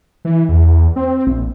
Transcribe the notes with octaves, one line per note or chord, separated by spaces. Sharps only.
E3
E2
C4
A#1